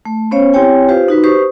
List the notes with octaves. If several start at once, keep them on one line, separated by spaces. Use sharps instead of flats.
A3
B3 C#4 C5 C#5 F5
C4 E4 G4 C#5 G5 G#5
F4 G4 B4 C5 F5
D#4 F#4 B4
G4 B4 C5 C#6 D#6